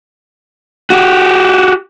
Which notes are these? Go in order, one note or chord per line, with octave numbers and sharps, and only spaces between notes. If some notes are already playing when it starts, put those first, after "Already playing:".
F#4 G4